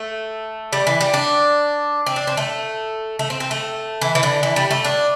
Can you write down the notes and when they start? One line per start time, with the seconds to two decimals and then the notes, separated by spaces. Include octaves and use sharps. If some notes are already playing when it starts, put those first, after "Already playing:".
Already playing: A3
0.73 G3
0.87 E3
1.01 G3
1.14 D4
2.06 C4
2.16 D4
2.27 C4
2.37 A3
3.19 A3
3.30 C4
3.40 C4
3.51 A3
4.01 E3
4.15 E3
4.23 D3
4.43 E3
4.56 G3
4.71 A3
4.84 D4